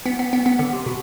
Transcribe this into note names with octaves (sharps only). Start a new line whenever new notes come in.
B3
B3
B3
B3
D3
C3
B2